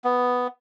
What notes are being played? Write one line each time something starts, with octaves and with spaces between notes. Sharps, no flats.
B3